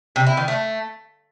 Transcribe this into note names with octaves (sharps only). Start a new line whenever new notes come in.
C3
E4
D#3
A3